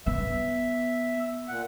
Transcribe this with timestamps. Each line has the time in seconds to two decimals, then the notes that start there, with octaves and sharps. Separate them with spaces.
0.06 B3 E5
1.49 A#2 F#5